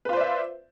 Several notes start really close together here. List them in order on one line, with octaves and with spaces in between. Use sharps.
B4 F4 C5 D5 E5